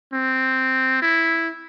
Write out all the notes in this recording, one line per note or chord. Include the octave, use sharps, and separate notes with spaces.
C4
E4